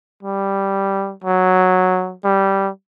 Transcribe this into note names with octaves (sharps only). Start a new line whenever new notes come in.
G3
F#3
G3